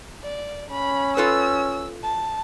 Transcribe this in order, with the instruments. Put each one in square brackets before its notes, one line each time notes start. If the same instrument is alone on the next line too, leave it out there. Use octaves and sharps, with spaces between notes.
[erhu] D5
[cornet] C#4 [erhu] B5
[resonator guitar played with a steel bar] F4 A4 B4 [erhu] E6
[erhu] A5